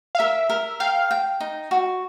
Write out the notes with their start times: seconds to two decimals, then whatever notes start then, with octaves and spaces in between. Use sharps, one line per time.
0.15 F5
0.19 A#4 E5
0.50 A#4
0.80 F5 G5
1.11 G5
1.40 D#4
1.71 F#4